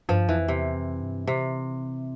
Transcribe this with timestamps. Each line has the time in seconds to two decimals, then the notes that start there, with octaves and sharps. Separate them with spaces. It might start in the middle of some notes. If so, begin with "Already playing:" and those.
0.09 G2 F3
0.28 F2 E3
0.48 E2 C3
0.75 F2
1.02 G2
1.27 C3